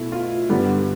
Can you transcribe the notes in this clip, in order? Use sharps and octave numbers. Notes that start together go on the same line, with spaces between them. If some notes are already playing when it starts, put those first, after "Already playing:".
Already playing: B2 A3 E4
F4
G2 D3 G3 B3